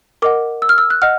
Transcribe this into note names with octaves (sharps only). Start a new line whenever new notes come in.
A#4 D#5 F#5 D6
E6
F6
E6
F#6
D#5 F#5 F6